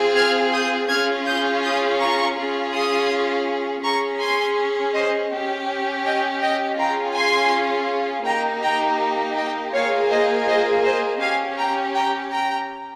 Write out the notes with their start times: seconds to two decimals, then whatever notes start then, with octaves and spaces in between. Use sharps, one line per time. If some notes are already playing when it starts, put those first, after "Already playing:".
Already playing: C4 F4 G#4
0.15 F6 G#6
0.52 D#6 G6
0.89 C#4 F4 G#4 F6 G#6
1.26 D#6 G6
1.63 D#6 G6
2.00 A#5 C#6
2.37 C#4 F4 G#4
2.74 C6 D#6
3.84 C#4 G#4 A#5 C#6
4.20 G#5 C6
4.95 C5 D#5
5.32 C#4 G4
6.05 D#5 G5
6.42 D#5 G5
6.78 C#4 F4 G#4 G5 A#5
7.15 G#5 C6
8.26 A#3 D#4 G4 G5 A#5
8.63 G5 A#5
9.36 D#5 G5
9.74 A#3 F4 G#4 C#5 F5
10.10 C5 D#5
10.48 C5 D#5
10.84 C5 D#5
11.21 C#4 G4 F5 G#5
11.58 G5 A#5
11.94 G5 A#5
12.31 G5 A#5